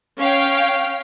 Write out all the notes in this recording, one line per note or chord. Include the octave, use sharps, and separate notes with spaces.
C#4 F5 G5